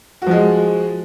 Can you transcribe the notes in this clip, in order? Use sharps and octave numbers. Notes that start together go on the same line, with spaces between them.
F3 G#3 F#4